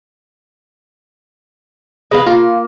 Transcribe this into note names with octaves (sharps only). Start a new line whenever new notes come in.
G#3 B3 B4 D#5 F5
A#3 F4